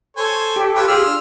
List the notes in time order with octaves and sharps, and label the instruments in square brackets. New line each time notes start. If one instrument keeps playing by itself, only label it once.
[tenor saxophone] A4 [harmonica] C5 C#5 G#5
[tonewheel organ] G4
[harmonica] F4 B4 C#5
[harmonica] F4 E6 F6 [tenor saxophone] G#4
[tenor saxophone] D4